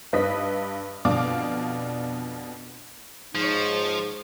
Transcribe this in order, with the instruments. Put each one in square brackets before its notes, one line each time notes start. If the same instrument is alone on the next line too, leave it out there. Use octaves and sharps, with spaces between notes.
[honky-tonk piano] G2 B4 D#5 B6
F2 B2 D3 D4 F5 D6
[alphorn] G#2 [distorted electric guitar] F3 [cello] D#4 C#5